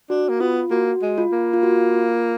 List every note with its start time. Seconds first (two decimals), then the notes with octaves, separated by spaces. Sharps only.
0.10 D4 F#4
0.29 A#3
0.40 B3 F4
0.71 A#3 F#4
1.02 G#3
1.18 F4
1.32 A#3
1.53 F4
1.63 F#4
1.94 F4